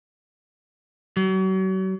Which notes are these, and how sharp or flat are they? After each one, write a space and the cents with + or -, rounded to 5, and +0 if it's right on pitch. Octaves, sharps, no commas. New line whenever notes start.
F#3 +40